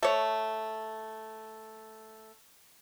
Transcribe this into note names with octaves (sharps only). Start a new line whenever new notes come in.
A3 C#5